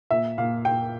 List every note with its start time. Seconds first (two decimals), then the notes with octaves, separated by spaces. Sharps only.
0.11 A#2 E5
0.38 A#2 F5
0.65 A#2 G5